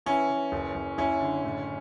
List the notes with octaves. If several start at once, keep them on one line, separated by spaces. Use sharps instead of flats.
E3 C#4 E4
E3
F#1
F#1
F#1 C#4 E4
D3
A2